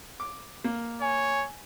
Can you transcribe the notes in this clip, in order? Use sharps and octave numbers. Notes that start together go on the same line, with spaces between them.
D6
A#3
C#5 G#5